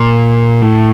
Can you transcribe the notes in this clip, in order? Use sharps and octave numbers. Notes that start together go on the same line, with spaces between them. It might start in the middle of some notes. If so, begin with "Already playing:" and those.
Already playing: A#2
A2